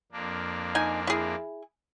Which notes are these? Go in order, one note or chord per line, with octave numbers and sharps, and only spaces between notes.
F2 A#3 D4
D#4 G#5
E4 G#4